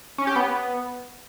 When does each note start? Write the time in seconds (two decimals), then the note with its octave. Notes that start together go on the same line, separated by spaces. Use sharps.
0.18 C#4
0.27 G4
0.36 B3